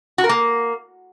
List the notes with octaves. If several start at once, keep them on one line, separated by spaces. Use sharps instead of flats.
F#4
A#4
A#3